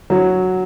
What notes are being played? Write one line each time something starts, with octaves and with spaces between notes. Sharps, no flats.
F#3